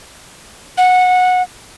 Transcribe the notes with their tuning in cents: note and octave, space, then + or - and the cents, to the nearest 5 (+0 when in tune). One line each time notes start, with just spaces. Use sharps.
F#5 -15